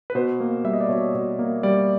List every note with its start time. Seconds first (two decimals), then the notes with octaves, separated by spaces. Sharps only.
0.10 B4
0.15 B2 C5
0.40 A#3
0.64 G3 E5
0.73 D#5
0.81 D5
0.89 B2 C#5
1.14 B2
1.39 A#3
1.63 G3 D5